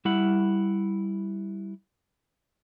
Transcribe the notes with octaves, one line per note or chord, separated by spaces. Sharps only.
G3 E4 F#5